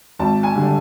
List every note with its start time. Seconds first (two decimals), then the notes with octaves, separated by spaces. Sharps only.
0.19 G#1 A5
0.43 G#5
0.56 D3 G3